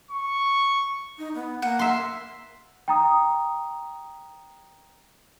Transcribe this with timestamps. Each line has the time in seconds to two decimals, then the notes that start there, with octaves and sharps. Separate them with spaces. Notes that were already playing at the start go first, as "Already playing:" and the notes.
0.11 C#6
1.18 D#4
1.35 B3
1.62 A#3 F#5
1.79 E5 C6
2.88 G5 A#5 D#6